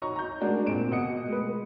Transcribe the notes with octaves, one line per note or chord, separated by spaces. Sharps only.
D#4 F#4 C#5 D#5 A#5 C#6
A#5 G6
G#3 D4 F#4 G#4 A#4 D5
A#2 C4 D7 E7
B2 D#5 F#5 D#6 C#7
G#3 B4